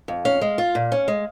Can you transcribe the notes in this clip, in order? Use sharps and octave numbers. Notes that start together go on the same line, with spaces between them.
F2
C#4 F5
G#3
F4
A#2
C#4
G#3